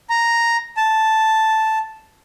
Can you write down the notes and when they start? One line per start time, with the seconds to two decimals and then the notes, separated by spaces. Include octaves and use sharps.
0.10 A#5
0.77 A5